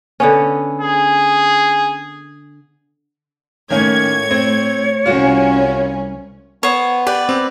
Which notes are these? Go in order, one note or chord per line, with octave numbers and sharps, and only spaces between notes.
D3 B3 C#4
G#4
A2 D#3 A#3 C#4 C#5 G#6
C4
C2 C#4 F4 F#4
B3 C5 C#5
G4 B4 D5
C4